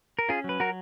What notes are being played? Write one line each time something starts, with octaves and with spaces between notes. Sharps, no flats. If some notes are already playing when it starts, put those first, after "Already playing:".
A#4
C#4 F4 G#4
F#3 B4
F#3 F#4 A#4